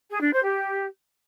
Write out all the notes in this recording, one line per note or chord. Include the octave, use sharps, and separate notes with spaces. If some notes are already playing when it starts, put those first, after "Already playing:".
G#4
D4
C5
G4